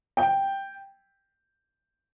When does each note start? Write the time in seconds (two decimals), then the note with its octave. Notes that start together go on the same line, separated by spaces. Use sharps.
0.17 G5